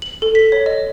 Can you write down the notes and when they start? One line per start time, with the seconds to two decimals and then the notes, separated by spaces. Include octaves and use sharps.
0.02 F#7
0.22 A4
0.35 B6
0.52 C#5
0.66 D#5